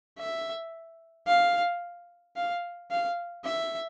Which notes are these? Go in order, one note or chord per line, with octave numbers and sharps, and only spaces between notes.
E5
F5
F5
F5
E5